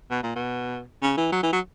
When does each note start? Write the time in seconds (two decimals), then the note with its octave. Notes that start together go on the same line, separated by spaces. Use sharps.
0.11 B2
0.23 A#2
0.36 B2
1.02 C#3
1.17 E3
1.32 F#3
1.43 E3
1.53 F#3